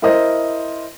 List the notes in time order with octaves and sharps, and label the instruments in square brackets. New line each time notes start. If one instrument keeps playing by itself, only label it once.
[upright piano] E4 A#4 C5 D#5